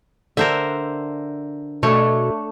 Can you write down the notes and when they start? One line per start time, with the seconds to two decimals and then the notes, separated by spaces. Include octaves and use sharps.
0.37 D3 D4 A#4 C5 E5
1.83 B2 A3 D4 C#5